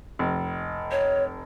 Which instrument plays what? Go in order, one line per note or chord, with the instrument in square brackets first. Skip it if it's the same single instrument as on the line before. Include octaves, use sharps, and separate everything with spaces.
[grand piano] F1
[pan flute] C#5